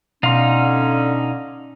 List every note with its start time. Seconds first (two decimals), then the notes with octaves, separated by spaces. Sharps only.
0.23 B2 D3 C#4 D#4 F5 C6